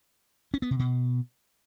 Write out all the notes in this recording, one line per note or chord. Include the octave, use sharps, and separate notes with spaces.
C#4
B3
C3
B2